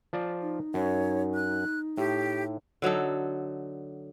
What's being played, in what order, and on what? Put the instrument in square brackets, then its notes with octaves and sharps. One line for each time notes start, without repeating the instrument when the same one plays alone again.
[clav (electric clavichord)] F3 F4 D5
[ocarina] D#4
[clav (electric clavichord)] F#2 [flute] C#5
[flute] F#6
[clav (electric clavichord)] A2 [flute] G4
[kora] D3 F#3 D#4 A4